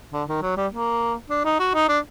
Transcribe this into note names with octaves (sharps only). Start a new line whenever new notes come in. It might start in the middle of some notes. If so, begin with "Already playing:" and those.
D3
D#3
F#3
G3
A#3
D4
D#4
F#4
D#4
D4